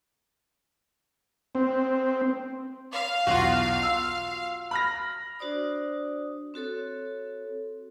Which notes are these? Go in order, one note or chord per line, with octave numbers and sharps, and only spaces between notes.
C4
F5
B1 E2 F4 F#4
E6
B5 F6 A#6
D4 F#4 C5 D5 D#6
C4 F#4 A4 C#5